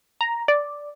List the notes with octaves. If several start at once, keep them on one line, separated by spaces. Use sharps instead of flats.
A#5
D5